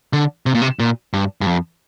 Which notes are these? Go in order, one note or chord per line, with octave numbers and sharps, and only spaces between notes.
D3
C3
A#2
C3
A#2
G2
G2
F2